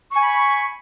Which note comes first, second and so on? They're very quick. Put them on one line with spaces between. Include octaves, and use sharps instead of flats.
C#6 G#5 B5